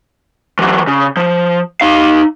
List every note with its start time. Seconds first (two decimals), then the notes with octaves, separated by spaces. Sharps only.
0.59 E3 F#3
0.87 C#3
1.17 F3
1.81 D#4 F5